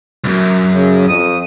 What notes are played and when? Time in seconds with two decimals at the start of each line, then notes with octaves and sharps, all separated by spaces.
0.24 C2 F#2
0.73 C#3
1.09 F2 D#6